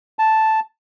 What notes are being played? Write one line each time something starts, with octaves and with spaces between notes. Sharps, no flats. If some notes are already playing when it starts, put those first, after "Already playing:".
A5